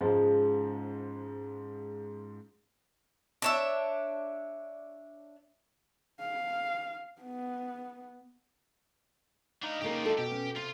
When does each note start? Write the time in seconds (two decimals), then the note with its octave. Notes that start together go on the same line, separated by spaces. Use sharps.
0.01 G#2 C#3 F3 G#3
3.42 D4 C#5 E5
6.20 F5
7.21 B3
9.63 D4 D#4 F5
9.82 C#3 A#3 F4 G4 A#4
10.05 A4 D#5
10.18 B2 G4
10.32 C#4
10.56 C3 F4